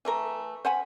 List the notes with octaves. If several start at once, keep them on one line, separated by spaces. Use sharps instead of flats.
E3 A3 A#4
C5 F#5 G#5 B5